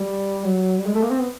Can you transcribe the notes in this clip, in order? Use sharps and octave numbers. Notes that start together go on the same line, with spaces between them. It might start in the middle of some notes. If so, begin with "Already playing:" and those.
Already playing: G3
F#3
G3
G#3
A3
A#3
C4
B3